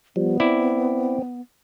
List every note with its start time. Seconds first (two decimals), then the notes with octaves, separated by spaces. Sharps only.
0.16 F3 G3 B3
0.40 C4 E4 D5